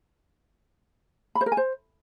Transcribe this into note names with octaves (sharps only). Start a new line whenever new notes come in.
B5
C5
A#4
G#5
C5